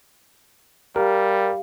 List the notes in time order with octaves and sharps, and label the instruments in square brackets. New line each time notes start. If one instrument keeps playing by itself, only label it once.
[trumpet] G3 [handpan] G4 [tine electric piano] A#4 [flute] F5